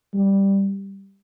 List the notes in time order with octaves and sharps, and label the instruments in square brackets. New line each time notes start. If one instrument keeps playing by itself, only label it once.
[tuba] G3